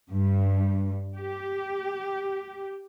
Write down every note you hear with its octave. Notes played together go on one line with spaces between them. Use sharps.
G2
G4